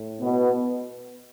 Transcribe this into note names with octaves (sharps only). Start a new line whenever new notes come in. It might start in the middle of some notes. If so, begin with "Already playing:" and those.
Already playing: A2
B2 B3